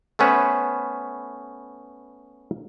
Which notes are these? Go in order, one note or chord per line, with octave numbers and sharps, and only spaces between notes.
A3 B3 C#4 B4 C5 E5